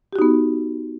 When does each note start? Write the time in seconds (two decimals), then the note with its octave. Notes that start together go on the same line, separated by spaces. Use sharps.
0.13 G4
0.16 F#4
0.19 D#4
0.22 B3